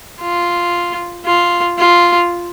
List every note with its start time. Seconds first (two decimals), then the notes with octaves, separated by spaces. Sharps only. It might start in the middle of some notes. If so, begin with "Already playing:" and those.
0.21 F4
1.25 F4
1.78 F4